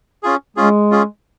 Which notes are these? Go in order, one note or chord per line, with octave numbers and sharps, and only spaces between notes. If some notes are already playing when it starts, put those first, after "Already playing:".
C#4 F4 G#4
G#3 C#4 F4 G#4
C#4 F4 G#4